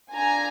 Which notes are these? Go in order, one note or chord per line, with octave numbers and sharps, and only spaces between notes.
D4 F4 A4 G#5 A#5